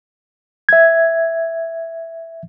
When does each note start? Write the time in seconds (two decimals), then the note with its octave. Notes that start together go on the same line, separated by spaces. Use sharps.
0.69 E5 G#6